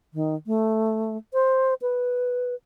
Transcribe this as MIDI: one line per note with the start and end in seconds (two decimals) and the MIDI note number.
0.14 0.35 51
0.47 1.17 57
1.33 1.74 72
1.82 2.55 71